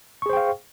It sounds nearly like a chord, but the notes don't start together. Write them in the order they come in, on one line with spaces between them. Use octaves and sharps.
C#6 G#4 C5 G5 F5